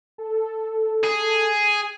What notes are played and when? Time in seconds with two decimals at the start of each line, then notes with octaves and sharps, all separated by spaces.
0.18 A4
1.04 G#4